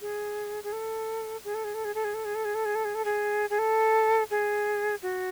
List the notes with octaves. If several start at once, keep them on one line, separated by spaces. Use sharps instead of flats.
G#4
G#4
A4
G#4
A4
G#4
A4
G#4
A4
G#4
A4
G#4
A4
G#4
A4
G#4
A4
G#4
A4
G#4
G#4
A4
G#4
F#4